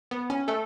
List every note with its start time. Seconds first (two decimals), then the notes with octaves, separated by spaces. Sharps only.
0.11 B3
0.30 C#4
0.48 A3 A4